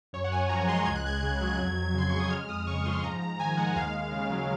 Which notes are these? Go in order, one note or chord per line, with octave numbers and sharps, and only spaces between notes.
F#2 C#5
F#5
F#2 G#5
F3 A#5
G#3 C6
C#2 G#6
F#6
C#2 G#6
C#3
F#3
F2
F2
C#3 C6
G#3 C#6
D#6
G#3 F6
F2 D#6
C#3 C#6
F3 C6
G#2 A#5
G#2 A#5
D#3 G#5
G#3 F#5
D#2 F5
D#2
C#3
F#3